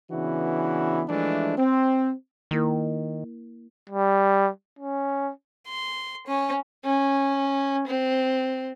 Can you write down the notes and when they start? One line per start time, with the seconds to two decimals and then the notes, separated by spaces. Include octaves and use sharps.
0.11 C#3 E3 B3 D4 E4 F#4
1.08 E3 F3 G#3 A3 D4
1.57 C4
2.51 D#3 A#3 E4 A#4
3.89 G3
4.79 C#4
5.67 C6
6.27 C#4
6.84 C#4
7.87 C4